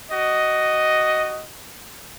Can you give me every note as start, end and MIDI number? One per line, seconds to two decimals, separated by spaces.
0.11 1.45 66
0.11 1.45 75